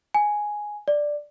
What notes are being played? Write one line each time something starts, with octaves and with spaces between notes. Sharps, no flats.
G#5
D5